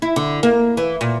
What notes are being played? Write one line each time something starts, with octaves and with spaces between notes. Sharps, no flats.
E4
D3
A#3
E3
A#2